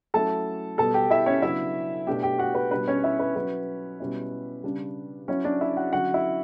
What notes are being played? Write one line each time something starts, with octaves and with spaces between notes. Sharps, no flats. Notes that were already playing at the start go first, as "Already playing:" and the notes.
F#3 A3 C#4 E4 A4 A5
B2 G3 B3 A4 A5
G4 G5
E4 E5
C#4 C#5
C#3 F#3 B3 D4 E4 E5
B2 A3 D4 G4 G5
G4 G5
F#4 F#5
B4
B2 G3 D4 B4
C#4 C#5
E4 E5
B4
F#3 C#4 E4 B4
B2 G3 C#4 E4
C#3 G3 D4
F#3 C#4 E4 C#5
D4 D5
E4 E5
F#4 F#5
D3 F#3 C#4 E4 F#4 F#5
E4 E5